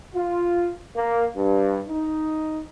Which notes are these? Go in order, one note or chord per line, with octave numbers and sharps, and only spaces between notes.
F4
A#3
G2
D#4